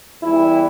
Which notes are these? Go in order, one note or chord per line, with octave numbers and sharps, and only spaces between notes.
E2 E3 G3 E4